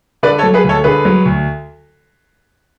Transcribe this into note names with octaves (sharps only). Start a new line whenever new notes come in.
D3 B4 D5
A4 C#5
F#3
G#4 B4
D2
A4 C#5
D3 G#4 B4
F#3
D2